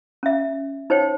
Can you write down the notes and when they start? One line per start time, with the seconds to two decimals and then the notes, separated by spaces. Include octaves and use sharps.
0.23 C#4 E5
0.90 D#4 C5 C#5 G5